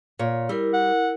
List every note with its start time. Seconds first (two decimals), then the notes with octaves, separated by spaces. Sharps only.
0.19 A#2 C#5
0.49 G3 E4 A#4
0.74 F#5